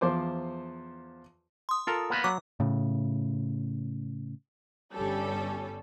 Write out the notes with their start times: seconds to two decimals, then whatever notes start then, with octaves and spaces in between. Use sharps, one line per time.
0.01 E2 F3 C5 D6
1.69 C6 D#6
1.87 F4 A4 A#4
2.10 A#3 B3 B4
2.24 F#3 D6
2.60 A2 C#3
4.93 G1 G3 C#4 A4